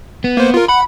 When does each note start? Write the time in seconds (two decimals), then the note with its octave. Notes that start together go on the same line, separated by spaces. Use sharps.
0.24 B3
0.37 A#3 C5
0.54 F4 A#4
0.69 F#5 B5